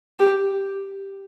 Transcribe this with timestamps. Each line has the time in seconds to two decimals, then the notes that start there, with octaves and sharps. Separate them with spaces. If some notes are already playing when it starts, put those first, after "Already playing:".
0.19 G4